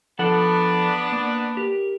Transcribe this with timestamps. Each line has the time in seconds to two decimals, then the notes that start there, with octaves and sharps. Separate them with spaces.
0.19 F3 B3 D4 A4 F#5
1.12 A#3
1.57 G4 A#4